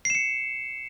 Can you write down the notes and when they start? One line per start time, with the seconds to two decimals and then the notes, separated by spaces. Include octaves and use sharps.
0.05 C7
0.10 E7
0.15 C#7